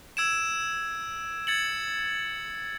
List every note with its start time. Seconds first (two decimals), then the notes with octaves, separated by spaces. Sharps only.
0.17 E6 G#6 D7 E7
1.47 G#6 A6 C#7 F#7